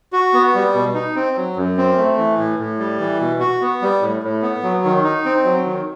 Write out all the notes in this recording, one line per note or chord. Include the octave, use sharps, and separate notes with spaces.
F#4
B3
G3
B2
D#4
C4
F#3
F#2
C4
A3
E3
A2
A2
G3
E3
B2
F#4
B3
G3
A2
A2
B3
F#3
D#3
D#4
C4
F#3
D#3